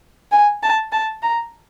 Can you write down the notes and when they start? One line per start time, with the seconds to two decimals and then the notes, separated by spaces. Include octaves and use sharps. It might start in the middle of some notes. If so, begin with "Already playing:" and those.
0.32 G#5
0.63 A5
0.92 A5
1.22 A#5